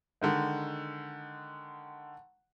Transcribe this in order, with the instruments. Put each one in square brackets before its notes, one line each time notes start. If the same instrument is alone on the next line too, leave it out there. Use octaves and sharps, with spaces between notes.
[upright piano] D3 D#3 G#3